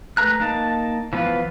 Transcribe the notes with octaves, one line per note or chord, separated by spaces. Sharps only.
A3 B4 A#5 F#6
A#3 D#4 A5
E3 F3 B3 F4 B4